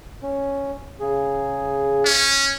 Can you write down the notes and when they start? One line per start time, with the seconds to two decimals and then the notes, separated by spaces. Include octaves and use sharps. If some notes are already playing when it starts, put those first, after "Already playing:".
0.23 C#4
1.00 C#3 G#4
2.05 C#4